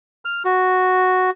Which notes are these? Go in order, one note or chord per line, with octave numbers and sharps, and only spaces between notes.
F6
F#4